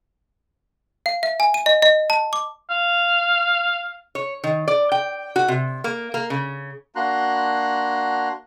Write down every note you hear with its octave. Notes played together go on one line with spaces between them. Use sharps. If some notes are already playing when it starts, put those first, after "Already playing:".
F5
E5
G#5
D#7
D#5
D#5
A5
D6
F5
C#5
D#3
D5
G5
F#4
C3
A#3
A#3
C#3
A#3 D4 F#4 A#5 C6 F#6